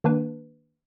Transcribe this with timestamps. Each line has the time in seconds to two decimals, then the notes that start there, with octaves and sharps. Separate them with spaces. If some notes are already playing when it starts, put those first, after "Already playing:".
0.04 D#3 A#3 D4 B4